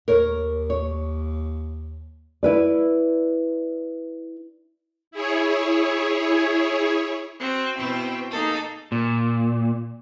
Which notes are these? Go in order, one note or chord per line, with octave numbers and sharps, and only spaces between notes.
D#2 A#4 C#5
C#5
E4 B4 D5
E4 G#4 C#5
C4 F#4
B2 C4 E4 G5
A#3 D#4 G#4 A4
A#2